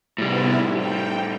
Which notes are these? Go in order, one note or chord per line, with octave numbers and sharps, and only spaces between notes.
A2 C3 G3 B3 E4
G5